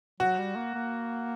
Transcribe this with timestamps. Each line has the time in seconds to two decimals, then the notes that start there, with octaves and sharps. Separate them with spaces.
0.20 F#3 F#4
0.38 G3
0.56 A#3
0.74 A#3